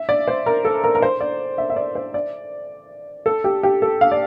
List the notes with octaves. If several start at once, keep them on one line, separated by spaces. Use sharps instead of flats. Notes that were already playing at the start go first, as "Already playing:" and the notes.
Already playing: E5
D5
C5
A#4
A4
A#4
A#4
C5
D5
E5
E5
D5
C5
D5
A4
G4
G4
A4
F5
D5